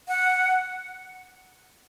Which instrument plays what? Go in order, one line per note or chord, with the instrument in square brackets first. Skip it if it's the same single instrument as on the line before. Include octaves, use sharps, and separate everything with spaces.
[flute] F#5